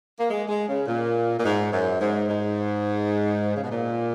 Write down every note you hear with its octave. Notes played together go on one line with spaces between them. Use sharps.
A#3
G#3
G#3
C#3
A#2
A#2
G#2
F#2
G#2
G#2
C#3
B2
A#2